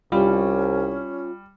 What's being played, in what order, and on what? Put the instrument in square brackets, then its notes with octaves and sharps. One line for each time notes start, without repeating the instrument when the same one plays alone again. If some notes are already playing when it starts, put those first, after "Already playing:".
[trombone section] C2 [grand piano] G3 [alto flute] C#4 [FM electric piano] F4